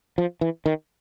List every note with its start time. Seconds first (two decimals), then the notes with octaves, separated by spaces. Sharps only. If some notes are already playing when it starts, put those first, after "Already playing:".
0.18 F3
0.41 E3
0.66 D#3